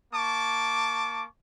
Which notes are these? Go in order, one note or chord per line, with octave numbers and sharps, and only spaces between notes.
A#3 A5 C#6 D6